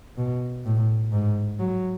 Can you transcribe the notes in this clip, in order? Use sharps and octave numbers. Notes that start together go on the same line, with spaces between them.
B2
A2
G#2
F#3